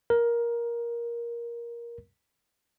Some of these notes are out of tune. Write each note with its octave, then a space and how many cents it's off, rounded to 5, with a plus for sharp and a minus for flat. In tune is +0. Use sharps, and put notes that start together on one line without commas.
A#4 +15